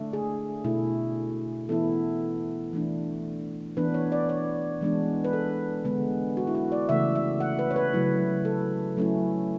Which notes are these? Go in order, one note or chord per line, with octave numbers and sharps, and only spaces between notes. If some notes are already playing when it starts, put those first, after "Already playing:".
Already playing: D3 A3 D4
G#4
B2 A3 E4
E3 B3 E4 A4
E3 A3 D4
E3 B3 D4 B4
C#5
D5
C#5
E3 G#3 B3 D4
B4
A4
D3 G#3 B3
F#4
E4
F#4
D5
C#3 E3 A3 E5
E5
F#5
B4
C#5
B4
C#3 F#3 A3 E4
A4
F#3 A3 C#4 E4